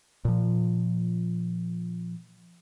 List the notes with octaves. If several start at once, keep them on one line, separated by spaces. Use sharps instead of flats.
A#2 F3